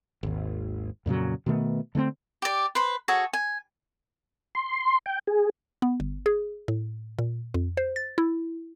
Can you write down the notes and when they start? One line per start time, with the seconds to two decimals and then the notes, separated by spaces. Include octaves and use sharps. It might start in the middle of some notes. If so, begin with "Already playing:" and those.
0.23 G#1 D#2
1.06 F2 A#2 C#3 F#3
1.46 B2 D#3 A3 B3
1.95 D3 A3 A#3 C4
2.42 G4 D5
2.75 B4 C5 C6
3.08 F#4 G#4 A4 C#5
3.33 G#5
4.55 C6
5.06 G5
5.27 G#4
5.82 B3
6.00 G1
6.26 G#4
6.68 A2
7.19 A#2
7.54 F2
7.77 C5
7.96 A6
8.18 E4